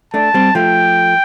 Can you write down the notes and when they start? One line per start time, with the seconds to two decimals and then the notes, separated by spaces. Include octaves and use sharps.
0.14 A3 D4 A5
0.34 G3 C4
0.55 F3 A3 G5